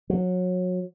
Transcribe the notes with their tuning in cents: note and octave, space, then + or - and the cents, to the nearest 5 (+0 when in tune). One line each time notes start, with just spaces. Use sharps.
F#3 -25